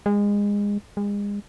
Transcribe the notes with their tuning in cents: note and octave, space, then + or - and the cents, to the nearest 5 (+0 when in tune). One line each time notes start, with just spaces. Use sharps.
G#3 -25
G#3 -35